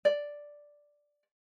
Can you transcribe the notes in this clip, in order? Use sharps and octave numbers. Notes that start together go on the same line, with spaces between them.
D5